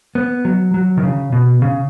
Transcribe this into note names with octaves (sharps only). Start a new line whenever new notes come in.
B3
F#3
F#3
D#3
C#3
B2
C#3